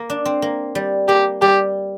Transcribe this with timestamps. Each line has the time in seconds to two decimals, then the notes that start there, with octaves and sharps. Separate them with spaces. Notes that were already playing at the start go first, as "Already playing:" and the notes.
Already playing: A#3 A#4
0.10 D4
0.25 C4
0.42 A#3
0.75 G3
1.08 A#3 G4
1.42 G3 G4